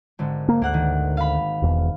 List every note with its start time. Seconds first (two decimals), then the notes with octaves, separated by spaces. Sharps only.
0.19 G#1 D3
0.48 A#3
0.62 D2 A#3 F#5 F#6
0.74 D#3
1.17 F5 B5
1.62 E1 E2